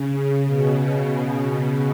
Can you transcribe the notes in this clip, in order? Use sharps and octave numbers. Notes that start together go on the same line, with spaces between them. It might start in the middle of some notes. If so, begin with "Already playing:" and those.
Already playing: C#3
C#3
B2